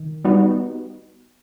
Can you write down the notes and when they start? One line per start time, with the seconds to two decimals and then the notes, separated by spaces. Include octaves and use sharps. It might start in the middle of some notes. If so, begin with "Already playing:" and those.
Already playing: D#3
0.24 G3 B3 D#4 F#4